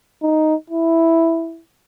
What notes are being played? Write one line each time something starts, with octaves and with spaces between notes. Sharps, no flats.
D#4
E4